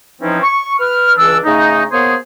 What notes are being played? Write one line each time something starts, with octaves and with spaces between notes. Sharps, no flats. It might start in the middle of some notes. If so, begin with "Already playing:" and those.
E3 F3 C4 C#4 D#4
C#6
B4 F6
C#2 E3 D4 E6
C#3 A3 D#4
A#3 B3 G#4 C5 C#5